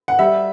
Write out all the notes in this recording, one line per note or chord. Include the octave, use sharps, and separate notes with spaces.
F#5
G3 E5